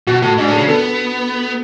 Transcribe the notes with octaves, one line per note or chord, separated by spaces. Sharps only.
B2 F#4
A2 F#4
G#2 D4
A2
G#4
C#3
B3 A4